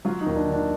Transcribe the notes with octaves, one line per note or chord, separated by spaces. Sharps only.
F#3 F4
D#4
D#2
D4
D#3
D4